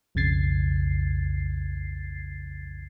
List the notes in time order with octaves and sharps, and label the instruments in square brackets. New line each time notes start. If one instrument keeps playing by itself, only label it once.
[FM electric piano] B1 F2 C#3 G#6 A6 C7